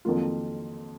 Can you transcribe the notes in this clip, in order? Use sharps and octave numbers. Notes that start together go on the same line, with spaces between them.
F2 D#3 F#3 A#3 F4